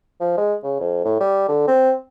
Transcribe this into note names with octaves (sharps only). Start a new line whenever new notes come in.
F3
G#3
C#3
F2
A2
G3
D3
C4